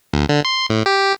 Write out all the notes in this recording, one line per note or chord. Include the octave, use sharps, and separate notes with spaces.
D2
D3
C6
A2
G4